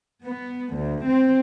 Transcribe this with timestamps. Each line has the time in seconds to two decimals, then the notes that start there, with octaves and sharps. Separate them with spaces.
0.25 B3
0.76 D2
1.06 C4